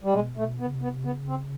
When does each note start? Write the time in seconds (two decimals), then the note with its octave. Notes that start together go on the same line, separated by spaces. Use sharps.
0.04 G3
0.13 B2 G#3
0.37 A#2 A3
0.44 B2
0.59 B3
0.66 C#3
0.75 C3
0.82 B3
1.04 C#3 B3
1.28 C4